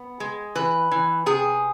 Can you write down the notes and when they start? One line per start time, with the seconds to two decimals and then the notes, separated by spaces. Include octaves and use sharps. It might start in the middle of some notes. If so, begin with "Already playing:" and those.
Already playing: B3
0.20 G#3
0.55 E3 B4
0.91 E3
1.26 C3 G#4